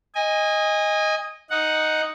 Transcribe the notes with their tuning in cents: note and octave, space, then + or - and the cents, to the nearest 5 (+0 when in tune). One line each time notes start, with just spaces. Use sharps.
D#5 +5 G#5 -25
D#4 +0 F#5 +0